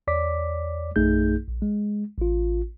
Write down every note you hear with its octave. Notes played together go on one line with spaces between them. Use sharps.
E2 C#5 D5 D6 B6
A#1 F#2 A3 D#4 G#4 G6
A#1
G#3
A1 F4